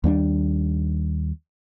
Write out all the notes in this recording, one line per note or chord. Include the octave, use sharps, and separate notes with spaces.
D#2 G3 C4 D4